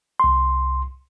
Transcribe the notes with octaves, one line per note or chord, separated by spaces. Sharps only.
C2 C6